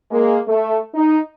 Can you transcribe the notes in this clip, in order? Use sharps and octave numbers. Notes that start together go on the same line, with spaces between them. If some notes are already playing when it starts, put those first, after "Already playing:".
G#3 A#3
A3
D#4